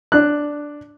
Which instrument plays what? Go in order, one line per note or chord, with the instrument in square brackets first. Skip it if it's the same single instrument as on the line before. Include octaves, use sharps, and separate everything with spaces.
[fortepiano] D4 F#6